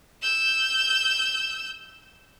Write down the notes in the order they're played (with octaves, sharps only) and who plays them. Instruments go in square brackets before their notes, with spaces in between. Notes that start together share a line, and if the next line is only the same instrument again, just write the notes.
[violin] E6 G6